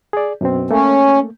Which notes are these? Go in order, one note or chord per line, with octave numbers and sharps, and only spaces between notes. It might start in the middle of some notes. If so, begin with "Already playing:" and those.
G#4 D5
F#2 B2 C4
A3 A#3 C#4